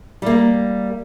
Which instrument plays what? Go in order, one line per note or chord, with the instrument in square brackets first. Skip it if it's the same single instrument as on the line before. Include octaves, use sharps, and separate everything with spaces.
[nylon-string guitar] G3 A#3